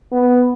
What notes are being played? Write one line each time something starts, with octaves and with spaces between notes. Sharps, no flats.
B3